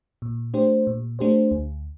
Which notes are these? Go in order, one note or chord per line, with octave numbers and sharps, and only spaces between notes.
A#2
A3 D4 G4 C5
A#2
A3 D4 G4 C5
D2